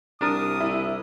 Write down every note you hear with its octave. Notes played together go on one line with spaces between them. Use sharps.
C2 D4 A#4 D#6
E4